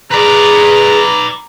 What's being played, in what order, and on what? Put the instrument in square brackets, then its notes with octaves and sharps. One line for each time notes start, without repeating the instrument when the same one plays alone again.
[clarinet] G#4 [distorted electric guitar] B4 D5 [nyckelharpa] A#5